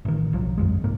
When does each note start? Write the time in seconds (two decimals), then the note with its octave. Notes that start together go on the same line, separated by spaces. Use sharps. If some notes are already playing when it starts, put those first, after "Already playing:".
0.05 A1 D#3
0.33 B1 F3 F#3
0.58 G1 F2 G#3
0.84 C2 G#2 A#3